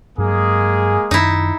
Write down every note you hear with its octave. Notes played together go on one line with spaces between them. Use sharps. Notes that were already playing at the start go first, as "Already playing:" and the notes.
G2 F#3 G#3 A#3 G#4
F#2 D#3 D#4 E4